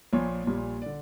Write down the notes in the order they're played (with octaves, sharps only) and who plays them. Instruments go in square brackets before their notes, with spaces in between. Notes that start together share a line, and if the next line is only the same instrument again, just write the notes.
[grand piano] A#1 A#2 F3 C#5
A#1 A#2 G3
D3 D5